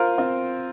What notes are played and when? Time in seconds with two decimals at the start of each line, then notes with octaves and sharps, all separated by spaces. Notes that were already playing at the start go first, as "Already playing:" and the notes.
Already playing: F4 A#4 C5
0.18 C4 F4